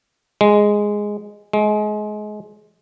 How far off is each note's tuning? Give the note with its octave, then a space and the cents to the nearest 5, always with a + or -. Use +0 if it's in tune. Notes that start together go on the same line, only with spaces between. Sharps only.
G#3 -5
G#3 +25